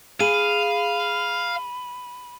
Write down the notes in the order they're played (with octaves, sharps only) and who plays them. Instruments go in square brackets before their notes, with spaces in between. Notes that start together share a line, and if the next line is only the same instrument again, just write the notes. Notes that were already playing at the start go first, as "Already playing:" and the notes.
[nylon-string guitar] G#4 [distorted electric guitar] F5 [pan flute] B5 [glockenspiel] D#7